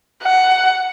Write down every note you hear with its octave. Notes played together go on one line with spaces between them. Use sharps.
F#5